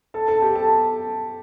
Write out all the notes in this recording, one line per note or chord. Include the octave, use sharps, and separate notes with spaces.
A4 A5
A4 A5
G4 G5
A4 A5